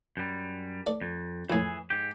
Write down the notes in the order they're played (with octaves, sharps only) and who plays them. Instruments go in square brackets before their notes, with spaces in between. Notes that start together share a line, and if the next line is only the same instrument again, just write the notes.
[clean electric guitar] F#2 G3
[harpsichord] A3 D5
[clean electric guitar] F2
[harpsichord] F2 A2 [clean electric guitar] E3 G#4
[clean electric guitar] G#2 G4